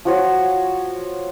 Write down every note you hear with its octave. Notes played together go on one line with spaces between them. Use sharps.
F3 F#4 C#5